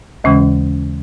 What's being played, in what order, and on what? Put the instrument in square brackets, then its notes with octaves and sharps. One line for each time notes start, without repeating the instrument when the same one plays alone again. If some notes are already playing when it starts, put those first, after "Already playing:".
[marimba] D#2 C#3 E3 G#3 C#4